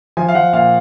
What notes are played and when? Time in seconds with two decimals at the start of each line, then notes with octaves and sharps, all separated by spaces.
0.17 F3 G#5
0.29 F5
0.34 F3 F#5
0.53 A#2 F5